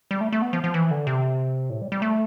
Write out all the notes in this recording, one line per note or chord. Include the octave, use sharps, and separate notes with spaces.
G3
A3
A3
B3
F3
F3
E3
D3
C3
A2
G3
G3
A3